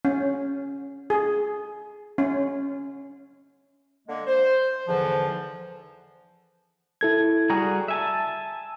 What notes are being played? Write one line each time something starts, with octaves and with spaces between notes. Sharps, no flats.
C#4
G#4
C#4
D3 G#3 A#3
C5
E2 G#2 D3 E3 F3
E4 A4 G#6
G3 F#4 G#4 A#5
E5 G#5 A5